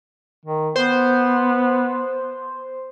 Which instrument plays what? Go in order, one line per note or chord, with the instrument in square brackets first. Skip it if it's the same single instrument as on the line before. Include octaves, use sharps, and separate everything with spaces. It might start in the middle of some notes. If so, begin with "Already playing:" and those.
[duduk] D#3
[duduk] B3 [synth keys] C5